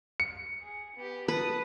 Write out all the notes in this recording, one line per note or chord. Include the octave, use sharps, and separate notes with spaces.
C#7
G#4
B3 G4
B4 A5 D#6